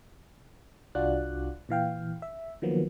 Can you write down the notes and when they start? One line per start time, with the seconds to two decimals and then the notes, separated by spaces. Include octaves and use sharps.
0.95 C2 D4 F4 F#4 D5 F#6
1.69 A#2 E3 F5 G5
2.22 E5
2.62 D#3 F3 F#3 A#3 B3